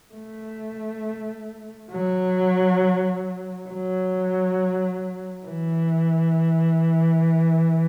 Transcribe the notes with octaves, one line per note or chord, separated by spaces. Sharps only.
A3
F#3
F#3
E3